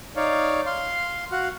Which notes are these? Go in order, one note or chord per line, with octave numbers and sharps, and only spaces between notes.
D#4 C#5 D5 F5
F5 C6
F#4 F5 F#5